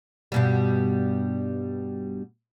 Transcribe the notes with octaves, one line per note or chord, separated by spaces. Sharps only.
G2 B2 G3